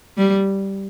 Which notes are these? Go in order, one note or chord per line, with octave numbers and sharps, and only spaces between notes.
G3